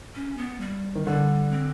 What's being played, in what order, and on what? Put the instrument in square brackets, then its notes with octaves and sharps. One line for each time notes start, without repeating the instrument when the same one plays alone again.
[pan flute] C#4
B3
G3
[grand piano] D#3
[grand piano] D3 [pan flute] G3
[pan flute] C4